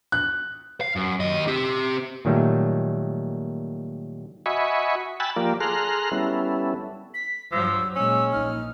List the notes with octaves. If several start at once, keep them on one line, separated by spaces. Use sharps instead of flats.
F#6
F5
F#2
D#2 D#5
C4 G4
A#2 D#3 F#3 G3 A3
F#4 D#5 E5 G#5 B5 C#6
G5 G#5 B5 E6 F#6 A6
F3 A#3 F4 G4 A#4 D5
G#4 A4 A#5 C6 F6 F#6
G3 B3 C#4 E4 A4
B6
G2 F3 F#3 E6
A#2 G#3 C#4 E6
A#1 D#4 F6